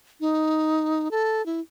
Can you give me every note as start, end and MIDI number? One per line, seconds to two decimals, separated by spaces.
0.20 1.08 63
1.11 1.44 69
1.46 1.60 64